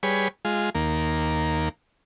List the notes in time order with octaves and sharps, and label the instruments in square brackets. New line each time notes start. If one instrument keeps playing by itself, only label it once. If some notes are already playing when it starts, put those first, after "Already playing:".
[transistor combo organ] G3 G#4 B4 C#5
G#3 F4
D#2 A#3